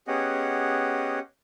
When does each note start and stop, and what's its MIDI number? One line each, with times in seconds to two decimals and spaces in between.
0.08 1.19 59
0.08 1.19 61
0.08 1.19 67
0.08 1.19 68
0.08 1.19 75
0.08 1.19 78